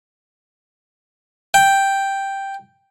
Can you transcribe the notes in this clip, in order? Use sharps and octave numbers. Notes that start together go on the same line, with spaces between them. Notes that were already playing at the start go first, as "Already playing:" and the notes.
G5